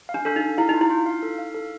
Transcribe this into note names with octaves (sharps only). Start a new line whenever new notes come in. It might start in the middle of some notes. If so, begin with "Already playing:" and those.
F5
D4
D4 A4
D#4 A4
E4 F5
D#4
F4
E4
F4
F5
A4
F5
A4